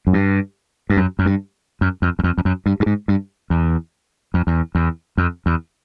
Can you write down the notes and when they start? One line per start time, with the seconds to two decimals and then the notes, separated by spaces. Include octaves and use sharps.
0.07 F#2
0.13 G2
0.90 G2
0.97 F#2
1.19 F#2
1.26 G2
1.81 F#2
2.02 F2
2.19 E2
2.24 F2
2.38 F2
2.45 F#2
2.66 G2
2.80 G2
2.86 G#2
3.08 G2
3.50 E2
4.34 F2
4.47 E2
4.75 E2
5.18 F2
5.46 E2